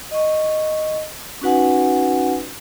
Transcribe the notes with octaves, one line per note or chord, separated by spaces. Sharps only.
D#5 C#6
C#4 D#4 F#4 B4 F#5 G#5